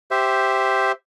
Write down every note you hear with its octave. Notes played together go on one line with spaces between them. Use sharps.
G4 C5 E5